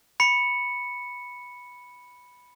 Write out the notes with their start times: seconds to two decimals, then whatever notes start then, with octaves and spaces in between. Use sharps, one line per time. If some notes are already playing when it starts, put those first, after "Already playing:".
0.20 B5 C#7